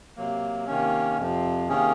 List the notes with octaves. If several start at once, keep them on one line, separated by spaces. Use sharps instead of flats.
C3 F#3 A#3
C3 D#3 A#3 C#4
F2 C3 F3
C3 D#3 A#3 C#4 G#4